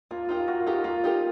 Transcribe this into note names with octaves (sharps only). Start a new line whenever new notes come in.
A#3 F4
D#4 F4 G4 A#4
A#3 F#4
F4
D#4 G4 A#4
F#4
A#3 F4
D#4 G4 A#4